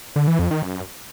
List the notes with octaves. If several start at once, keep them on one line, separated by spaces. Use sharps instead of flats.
D3
E3
F2
D#3
F#2